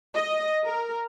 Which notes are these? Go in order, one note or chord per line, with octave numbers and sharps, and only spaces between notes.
D#5
A#4